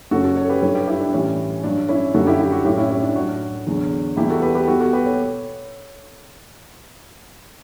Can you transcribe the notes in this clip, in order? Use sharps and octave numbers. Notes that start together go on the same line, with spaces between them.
F#2 C#3 F#3 F#4 A4
F#4 A4
A4 C#5
G4 B4
G2 F#3 A4 C#5
G4 B4
E4 G4
D4
A2 E3 G3 C#4
G2 F#3 D4
C#4 E4
F#2 D3 G3 F#4 A4
E4 G4
E4 G4
F#4 A4
A2 F#3 E4 G4
C#4 E4
C#4
D4
A2 F#3 D4 F#4
E2 D3 F#3
E2 B2 G3 E4 G4
F#4 A4
G4 B4
G4 B4
B2 G3 F#4 A4
F#4 A4
G4 B4
A4 C#5